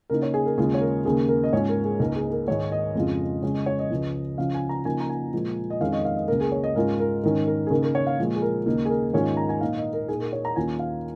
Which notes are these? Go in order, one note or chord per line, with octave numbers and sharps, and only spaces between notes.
C#3 A#3 D#4 A#4
C#5
G#4
A#4
D#2 C#3 G#3 F4 G#4
C#5
A#4
D#2 C#3 A#3 G#4
A#4
D#5
G#2 G#3 C#4 F4 C#5
A#4
G#4
C#2 C#3 A#3 D#4 A#4
G#4
A#4
G#2 D#3 G#3 C#5
D#5
F2 C#3 G#3 C#4 F4
C#3 G#3 C#4 C#5
D#5
C#5
D#5
C#2 C#3 F3
C#3 F3 C#4 F5
G#5
A#5
C#3 F3 A#3 D#4 G#5
A#5
G#5
A#2 F3 G#3
D#5
F2 D#3 G#3 C#4 F5
D#5
F5
D#5
C#2 C#3 A#3 A#4
G#4
C#5
D#5
G#2 G#3 C#4 F4 A#4
A#4
G#2 D#3 C#4 A#4
A#4
G#4
C#3 A#3 D#4 A#4
A#4
C#5
F5
A#2 F3 G#3
G#4
A#4
D#2 C#3 A#3 D#4 A#4
G#4
A#4
G#2 D#3 G#3 C#4 F4 C#5
A#5
G#5
A#2 A#3 D#4 F5
D#5
A#4
A#2 A#3 D#4 G#4
A#4
C#5
A#5
D#2 D#3 C#4 F4 G#5
F5